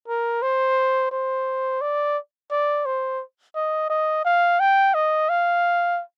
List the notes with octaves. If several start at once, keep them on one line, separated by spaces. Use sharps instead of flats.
A#4
C5
C5
D5
D5
C5
D#5
D#5
F5
G5
D#5
F5